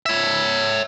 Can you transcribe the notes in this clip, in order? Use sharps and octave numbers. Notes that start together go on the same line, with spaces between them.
C#5 E5